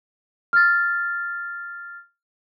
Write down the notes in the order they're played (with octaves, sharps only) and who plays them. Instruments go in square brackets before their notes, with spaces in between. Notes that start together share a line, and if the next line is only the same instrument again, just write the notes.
[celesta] F6 A6